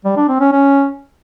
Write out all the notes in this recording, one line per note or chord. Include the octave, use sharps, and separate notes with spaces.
G3
D4
C4
C#4
C#4